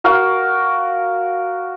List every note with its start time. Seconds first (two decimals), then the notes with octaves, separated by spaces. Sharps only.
0.04 F#4 A#4 F5